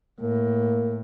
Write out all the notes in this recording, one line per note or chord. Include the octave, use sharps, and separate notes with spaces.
A2 A#3